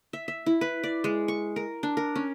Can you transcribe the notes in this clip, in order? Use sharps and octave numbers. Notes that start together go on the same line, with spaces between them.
E5
E5
E4
B4
D5
G#3
C#6
A#4
D4
A#4
C#4